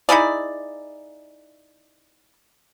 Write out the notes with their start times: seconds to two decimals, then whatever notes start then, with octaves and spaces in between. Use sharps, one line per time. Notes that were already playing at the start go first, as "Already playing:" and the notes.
0.09 D#4 E4 G#4 D5